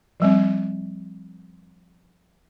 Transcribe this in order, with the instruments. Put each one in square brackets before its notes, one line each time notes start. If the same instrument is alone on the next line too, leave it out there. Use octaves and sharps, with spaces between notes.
[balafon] F3 G3 C4